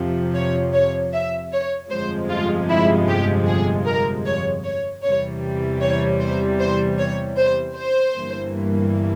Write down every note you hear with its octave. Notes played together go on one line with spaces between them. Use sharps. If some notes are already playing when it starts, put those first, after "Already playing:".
Already playing: F2 C3 F3
C#5
C#5
E5
C#5
G1 F2 C3 F3 G#3 C5
F4
E4
G4
G#4
A#4
C#5
C#5
E2 C3 E3 G3 C#5
C#5
C5
C5
C#5
C5
C5
G1 G2 E3 A#3